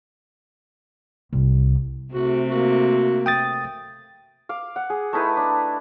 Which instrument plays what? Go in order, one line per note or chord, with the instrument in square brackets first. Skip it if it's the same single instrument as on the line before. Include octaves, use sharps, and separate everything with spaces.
[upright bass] C2
[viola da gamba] C3 A3 C4 [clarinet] F#4
[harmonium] A#3 [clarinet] F#4
[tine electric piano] G5 D#6 A6
[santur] F5 D6
F#5
G#4
A3 D#4 E4 B4
D4